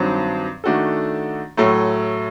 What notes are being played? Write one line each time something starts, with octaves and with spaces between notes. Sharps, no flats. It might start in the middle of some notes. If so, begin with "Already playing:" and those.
Already playing: G2 D#3 F#3 C4
D#3 A3 D4 F#4 A4
A2 F#3 A3